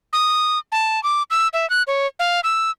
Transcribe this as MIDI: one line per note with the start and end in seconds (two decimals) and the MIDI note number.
0.13 0.59 87
0.72 1.02 81
1.03 1.23 86
1.30 1.48 88
1.53 1.68 76
1.70 1.83 90
1.87 2.07 73
2.19 2.40 77
2.44 2.71 88